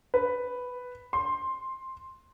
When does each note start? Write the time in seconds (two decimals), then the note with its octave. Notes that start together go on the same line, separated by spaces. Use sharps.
0.14 B4
1.13 C6